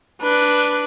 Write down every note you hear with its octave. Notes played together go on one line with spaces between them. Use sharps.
D4 B4